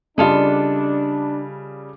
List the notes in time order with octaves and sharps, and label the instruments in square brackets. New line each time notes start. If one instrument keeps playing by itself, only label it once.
[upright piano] C#3 G3 [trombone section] D4 [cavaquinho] F4 A4 D#5